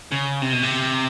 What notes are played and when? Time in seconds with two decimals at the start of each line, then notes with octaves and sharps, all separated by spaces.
0.12 C#3
0.42 C3
0.52 B2
0.63 C3